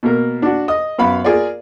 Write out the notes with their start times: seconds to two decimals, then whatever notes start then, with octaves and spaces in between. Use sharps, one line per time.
0.03 B2 A#3 A#4
0.42 D4 F#4
0.68 D#5 D#6
0.98 F#2 B3 F5 B5
1.24 F4 G#4 A#4 D5